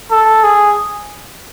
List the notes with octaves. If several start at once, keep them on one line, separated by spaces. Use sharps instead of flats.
A4
G#4